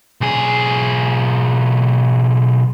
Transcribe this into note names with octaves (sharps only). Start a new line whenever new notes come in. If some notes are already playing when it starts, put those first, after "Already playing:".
B1 G#4